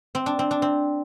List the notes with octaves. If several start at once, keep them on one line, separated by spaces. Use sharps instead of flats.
C4
D4
C4
D4
C4